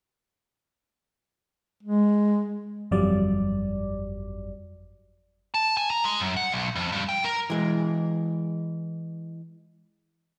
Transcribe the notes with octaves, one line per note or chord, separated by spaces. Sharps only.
G#3
G1 F2 F#3 G3 D5
A5
G#5
A#5
G#3
F#2
F#5
B1
F2
G2
G5
A#4
E3 G#3